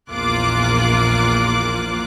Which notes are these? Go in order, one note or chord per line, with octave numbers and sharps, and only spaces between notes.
A#1 E2 A#3 F4 D6 F#6